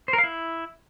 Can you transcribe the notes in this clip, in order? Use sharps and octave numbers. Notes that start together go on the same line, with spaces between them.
C5
A#4
F5
E4